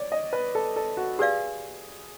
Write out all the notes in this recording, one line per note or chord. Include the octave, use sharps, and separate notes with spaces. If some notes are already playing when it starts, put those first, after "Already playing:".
Already playing: C#5 D5
D#5
B4
A4
A4
F#4
G4 G#4 B4 D5 F5